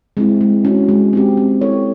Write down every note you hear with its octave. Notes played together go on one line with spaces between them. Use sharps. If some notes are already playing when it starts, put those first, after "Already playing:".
G#3 C4 E4
G#3
C#4 F#4
G#3
C4 D#4 G4
C4
E4 A4 C#5